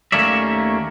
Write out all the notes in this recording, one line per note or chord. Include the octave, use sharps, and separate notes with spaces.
D#2 A3 A#3 C#4 D5 E5